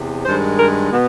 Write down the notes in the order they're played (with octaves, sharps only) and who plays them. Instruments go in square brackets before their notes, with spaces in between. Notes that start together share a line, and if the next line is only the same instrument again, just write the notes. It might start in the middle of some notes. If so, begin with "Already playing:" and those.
Already playing: [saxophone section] E2 C3
G2 D#3 G#3 C5
A#4
B2 B3